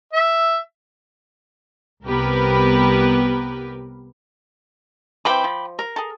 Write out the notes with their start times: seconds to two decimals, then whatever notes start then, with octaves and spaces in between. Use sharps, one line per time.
0.13 E5
2.05 C2 B3 G4 A#4 B4
5.25 E3 C4 G5 B5 D6
5.44 F3
5.79 A#4
5.96 G#4 A4